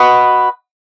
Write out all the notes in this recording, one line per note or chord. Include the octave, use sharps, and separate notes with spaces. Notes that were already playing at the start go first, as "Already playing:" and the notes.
Already playing: F#4 B4 D#5